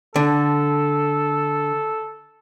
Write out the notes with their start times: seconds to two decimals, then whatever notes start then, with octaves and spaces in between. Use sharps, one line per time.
0.16 D3 A4